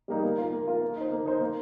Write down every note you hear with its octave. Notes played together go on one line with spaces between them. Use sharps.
G3 A#3 D#4
A#3
F4 A#4
A#3
F4 A#4
A#3
D#4 C5
A#3
D#4 C5
A#3